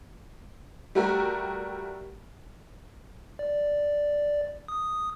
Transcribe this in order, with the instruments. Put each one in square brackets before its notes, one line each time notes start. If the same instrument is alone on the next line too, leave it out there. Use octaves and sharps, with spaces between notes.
[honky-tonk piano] G3 A3 F#4 G4 A#4
[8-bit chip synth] D5
D#6